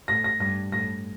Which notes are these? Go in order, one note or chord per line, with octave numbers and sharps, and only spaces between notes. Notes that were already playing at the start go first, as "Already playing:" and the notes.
A2 A#6
A#6
G2 A#6
A2 A#6